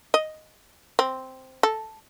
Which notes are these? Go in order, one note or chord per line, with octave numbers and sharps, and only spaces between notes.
D#5
C4
A4